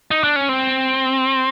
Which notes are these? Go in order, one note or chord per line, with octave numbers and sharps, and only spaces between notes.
D#4
D4
C#4
C4